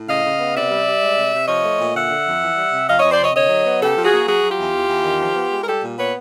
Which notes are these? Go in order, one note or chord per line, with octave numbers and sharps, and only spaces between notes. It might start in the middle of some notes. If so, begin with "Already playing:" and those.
Already playing: A2
C#3 D#5 F5
C#3
B3
C3 D5 E5
G3
G3
G#3
C3
C3
F3 C#5 D#5
A3
A#2
D3 E5 F#5
D3
F2
E3
G3
C3
F2 D#5 F5
F2 C#5 D#5
C5 D5
C3 C#5 D#5
D3 C#5 D#5
F#3
B3
C#3 G4 A4
F3
F#4 G#4
A#3
F#3 F#4 G#4
F#3
F4 G4
E2
E2
E2
D#3
F3
B3
G#3
A#4
G3 G4 A4
A#2
B3 B4 C#5